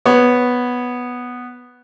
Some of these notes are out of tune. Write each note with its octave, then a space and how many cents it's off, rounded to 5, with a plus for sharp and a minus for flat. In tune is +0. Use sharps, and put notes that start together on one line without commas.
B3 +0 C#5 +0